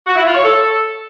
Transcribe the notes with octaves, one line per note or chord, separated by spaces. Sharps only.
F#4
E4
F4
C#5
A4